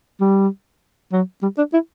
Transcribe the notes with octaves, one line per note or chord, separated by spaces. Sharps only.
G3
F#3
G3
D4
E4